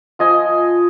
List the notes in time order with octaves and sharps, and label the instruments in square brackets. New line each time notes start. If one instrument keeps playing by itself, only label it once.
[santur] F3 D#5 G#5